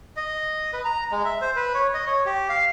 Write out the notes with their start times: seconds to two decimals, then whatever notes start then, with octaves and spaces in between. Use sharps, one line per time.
0.16 D#5
0.73 B4
0.85 A#5
1.12 G#3
1.25 E5
1.41 C5
1.56 B4
1.74 C#5
1.94 D#5
2.06 C#5
2.26 G4
2.49 F5